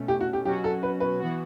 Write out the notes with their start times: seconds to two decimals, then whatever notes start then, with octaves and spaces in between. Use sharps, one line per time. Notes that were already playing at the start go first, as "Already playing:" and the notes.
Already playing: B2 A3 C#4
0.08 G4
0.21 F#4
0.33 G4
0.45 B2 F#3 C#4 F#4 G4
0.64 A4
0.83 B4
1.00 B4
1.20 E3 B3 F#4